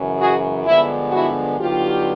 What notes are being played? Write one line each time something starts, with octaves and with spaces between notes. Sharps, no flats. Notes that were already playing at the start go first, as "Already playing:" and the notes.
Already playing: F#2 C#3 E3 G#3
F#4 G#4
G2 D3 F3 G#3 B3 E4
E4 F#4
G2 D3 F#3 B3 D#4 F4 G4